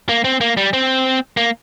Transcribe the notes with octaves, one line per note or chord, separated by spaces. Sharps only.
A#3
C4
A#3
G3
C4
A#3